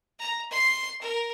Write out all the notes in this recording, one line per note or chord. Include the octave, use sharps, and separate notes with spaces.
A#5
C6
A#4